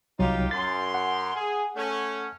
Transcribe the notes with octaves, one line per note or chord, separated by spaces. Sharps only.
C2 F#3 D#4 F4 G4
F#2 C6 A6
F#5
G#4
A3 C#4